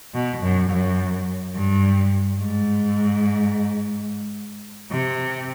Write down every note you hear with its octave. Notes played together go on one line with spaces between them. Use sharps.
B2
F#2
F#2
G2
G#2
C3